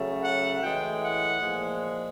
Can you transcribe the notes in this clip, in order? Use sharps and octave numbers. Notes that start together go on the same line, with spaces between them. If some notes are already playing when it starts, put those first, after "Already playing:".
Already playing: C#3 F#3 A3
F#5
A2 E3 G#3 G5
F#5
A#2 F3 G#3